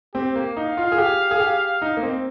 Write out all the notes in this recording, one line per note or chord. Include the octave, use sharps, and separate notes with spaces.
C4 G4
A#3
D#4 F5
F4
G#4
G4
G#4
G4
D#4
A#3
C4